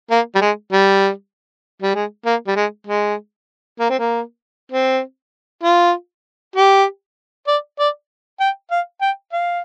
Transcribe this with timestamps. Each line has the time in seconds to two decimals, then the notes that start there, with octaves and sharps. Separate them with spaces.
0.11 A#3
0.35 G3
0.41 G#3
0.72 G3
1.82 G3
1.95 G#3
2.25 A#3
2.47 G3
2.56 G#3
2.87 G#3
3.80 A#3
3.90 C4
3.99 A#3
4.72 C4
5.63 F4
6.56 G4
7.47 D5
7.79 D5
8.40 G5
8.71 F5
9.01 G5
9.32 F5